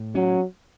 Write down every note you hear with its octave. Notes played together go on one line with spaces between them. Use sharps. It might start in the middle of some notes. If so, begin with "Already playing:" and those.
Already playing: A2
F#3 C#4